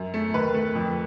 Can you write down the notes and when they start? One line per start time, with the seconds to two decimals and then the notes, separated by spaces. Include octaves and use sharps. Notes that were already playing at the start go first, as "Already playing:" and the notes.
Already playing: F#2
0.14 A3
0.34 D#2 B4
0.54 A3
0.75 F2